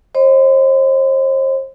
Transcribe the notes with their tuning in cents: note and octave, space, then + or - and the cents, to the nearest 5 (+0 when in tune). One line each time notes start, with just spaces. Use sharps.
C5 +40 D#5 -10 C6 -40